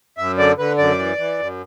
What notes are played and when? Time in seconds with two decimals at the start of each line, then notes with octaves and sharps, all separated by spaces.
0.18 F#2 E5
0.38 D3 D5
0.58 D3 B4
0.78 F#2 D5
0.99 E3
1.18 E3
1.39 F#2